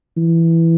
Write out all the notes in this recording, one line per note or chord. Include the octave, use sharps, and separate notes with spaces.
E3